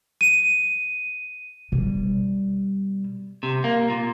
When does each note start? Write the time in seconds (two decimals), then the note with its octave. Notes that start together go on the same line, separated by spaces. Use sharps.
0.21 D#7
1.72 B2 G3
3.43 C3
3.64 A#3
3.90 A#2